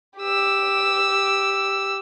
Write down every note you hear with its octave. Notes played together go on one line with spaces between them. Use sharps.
G4 E6